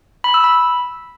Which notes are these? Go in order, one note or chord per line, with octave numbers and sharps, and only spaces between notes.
B5
E6
B5